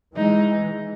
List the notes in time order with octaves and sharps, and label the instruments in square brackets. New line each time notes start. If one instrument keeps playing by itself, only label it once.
[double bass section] E3 G#3 [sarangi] D#4